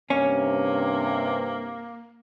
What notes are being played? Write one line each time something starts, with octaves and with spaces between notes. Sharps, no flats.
G2 C3 A#3 C#4